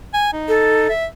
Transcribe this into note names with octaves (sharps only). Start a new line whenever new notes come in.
G#5
D#4
A4
E5